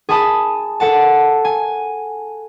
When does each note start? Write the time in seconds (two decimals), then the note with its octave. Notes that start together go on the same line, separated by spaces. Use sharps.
0.09 G#4 G#5 A5 B5 D#6
0.80 A4 F#5 A5
1.45 G#5